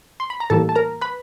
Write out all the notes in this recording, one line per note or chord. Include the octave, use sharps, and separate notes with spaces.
C6
B5
A#5
A2 E3 G3 A#3 A4 A5
A5
A#4 A#5
B4 B5